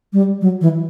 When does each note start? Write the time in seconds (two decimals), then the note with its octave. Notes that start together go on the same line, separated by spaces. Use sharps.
0.13 G3
0.41 F#3
0.61 E3